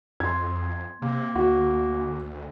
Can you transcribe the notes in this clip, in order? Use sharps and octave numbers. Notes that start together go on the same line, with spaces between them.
F2 C6 G#6
C3 A#3
D2 F#4